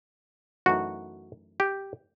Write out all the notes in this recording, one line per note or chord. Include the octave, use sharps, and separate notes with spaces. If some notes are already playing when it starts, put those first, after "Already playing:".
F#2 E3 A3 D#4 F#4
G4